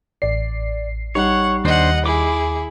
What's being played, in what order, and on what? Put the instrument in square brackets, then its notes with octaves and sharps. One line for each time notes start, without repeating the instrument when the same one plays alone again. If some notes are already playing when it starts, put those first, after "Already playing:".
[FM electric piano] A1 C7 [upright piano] D5
[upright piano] G3 D#4 [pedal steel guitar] C#5 [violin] F#5
[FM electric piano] D#2 [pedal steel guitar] D4 C5 [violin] D#5 F#5
[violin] E4 G#4 [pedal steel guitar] D6